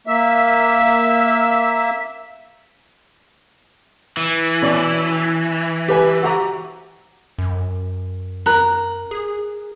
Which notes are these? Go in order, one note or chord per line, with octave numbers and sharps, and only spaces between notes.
A#3 E5
E3
B2 C#4 D5
G4 B4 G#5
F#4 G4 A#5
F#2
A#4 A#5 F#6
G#4